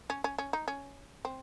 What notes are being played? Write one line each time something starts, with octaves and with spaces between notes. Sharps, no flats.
C#4
C#4
C#4
D#4
C#4
C4